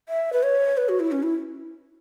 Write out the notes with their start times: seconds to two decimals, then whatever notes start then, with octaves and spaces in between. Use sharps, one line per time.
0.09 E5
0.33 B4
0.43 C#5
0.77 B4
0.89 F#4
1.00 E4
1.12 C#4
1.23 E4